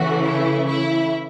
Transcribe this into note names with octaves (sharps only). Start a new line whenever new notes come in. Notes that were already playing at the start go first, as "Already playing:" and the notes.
Already playing: C#3 E3 A3 F#4
E4
E4